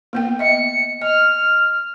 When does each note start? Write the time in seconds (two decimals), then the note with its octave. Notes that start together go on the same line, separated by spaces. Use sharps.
0.13 A#3 B3 G5
0.39 D#5 E5 C#7
1.02 D#5 F6